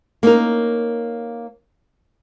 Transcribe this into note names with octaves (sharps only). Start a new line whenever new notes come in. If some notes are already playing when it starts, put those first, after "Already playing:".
A#3 C#4 D#4 A#4